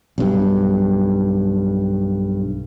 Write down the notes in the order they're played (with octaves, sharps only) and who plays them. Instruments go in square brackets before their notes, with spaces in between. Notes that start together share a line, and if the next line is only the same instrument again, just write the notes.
[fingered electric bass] B1 G2